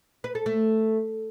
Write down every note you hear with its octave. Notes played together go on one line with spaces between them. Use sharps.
B4
A4
A3